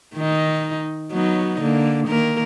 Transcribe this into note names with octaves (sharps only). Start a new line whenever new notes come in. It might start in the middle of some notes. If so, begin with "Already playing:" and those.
D#3 D#4
F#3 B3 D#4
D3 A#3
D#3 A#3 A#4